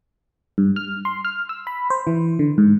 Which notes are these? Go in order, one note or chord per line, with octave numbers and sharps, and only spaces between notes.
G2
F6
C6
F6
E6
B5
C5
E3
D3
G#2